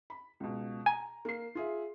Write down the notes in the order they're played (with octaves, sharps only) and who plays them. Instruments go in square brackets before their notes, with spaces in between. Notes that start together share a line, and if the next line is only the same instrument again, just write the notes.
[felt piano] B5
C#2 B2
[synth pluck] G#5 [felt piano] A#5
[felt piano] A#3 C7
F4 G#4 E5